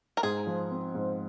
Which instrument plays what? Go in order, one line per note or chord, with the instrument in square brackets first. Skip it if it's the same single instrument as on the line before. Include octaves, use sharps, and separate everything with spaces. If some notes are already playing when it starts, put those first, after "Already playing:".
[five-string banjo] A#4
[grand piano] G#2 [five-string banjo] G#4
[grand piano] F3
C4
G#2